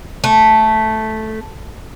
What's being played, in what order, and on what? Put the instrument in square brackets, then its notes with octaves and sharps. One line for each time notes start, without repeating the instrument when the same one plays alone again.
[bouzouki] A3